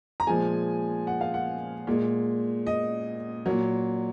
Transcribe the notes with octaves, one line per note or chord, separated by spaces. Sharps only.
A#5
A#2 F3 G#3 G#5
F#5
F5
F#5
A#2 G#3
D#5
A#2 F#3